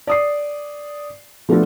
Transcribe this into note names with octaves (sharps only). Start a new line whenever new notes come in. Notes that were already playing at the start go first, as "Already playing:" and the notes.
D5 D#6 C7
F3 A3 B3 D4 F4 A4